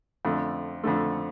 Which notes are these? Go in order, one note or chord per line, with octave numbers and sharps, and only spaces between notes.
F2 D3 A3
F2 D3 A3